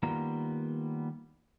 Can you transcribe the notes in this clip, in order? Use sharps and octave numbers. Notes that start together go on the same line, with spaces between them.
D#3 G3 A#3 B3 F4 A#5